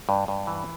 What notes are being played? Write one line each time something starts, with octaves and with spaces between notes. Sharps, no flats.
G2
G2
E3